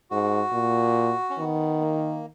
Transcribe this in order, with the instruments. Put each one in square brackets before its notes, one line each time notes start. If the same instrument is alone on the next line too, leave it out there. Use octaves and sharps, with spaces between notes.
[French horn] G#2 [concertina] F#4
[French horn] A#2
[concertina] C#4
[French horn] D#3 [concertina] B3
[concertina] A#3